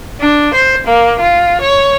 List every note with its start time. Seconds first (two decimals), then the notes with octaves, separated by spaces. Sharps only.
0.20 D4
0.54 C5
0.87 A#3
1.20 F4
1.61 C#5